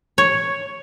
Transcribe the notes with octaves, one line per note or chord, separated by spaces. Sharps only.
C#5